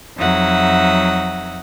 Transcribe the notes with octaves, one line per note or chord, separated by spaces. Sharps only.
F2 F#3 D#4 E5 F#5 D#6